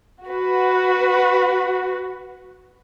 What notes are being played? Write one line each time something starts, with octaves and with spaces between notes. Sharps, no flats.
F#4 B4